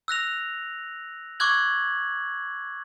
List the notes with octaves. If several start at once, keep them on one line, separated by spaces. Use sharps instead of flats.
E6 F#6 A#6 F7
C#6 D6 E6 F#6 G#6 F#7